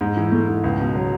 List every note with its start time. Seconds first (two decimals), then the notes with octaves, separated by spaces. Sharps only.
0.01 G#2
0.17 E3
0.32 A3
0.48 G#2
0.64 C#2
0.79 B2
0.95 F#3